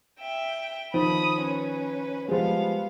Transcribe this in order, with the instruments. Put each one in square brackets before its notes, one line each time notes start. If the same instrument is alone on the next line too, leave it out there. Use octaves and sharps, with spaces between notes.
[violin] E5 G5
[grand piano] D#3 F3 [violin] B5 D#6
[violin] C#4 B4
[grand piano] F3 G3 G#3 [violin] B3 F5